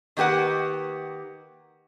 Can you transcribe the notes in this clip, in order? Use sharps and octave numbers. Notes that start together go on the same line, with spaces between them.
D#3 A#3 G4 B4 F#5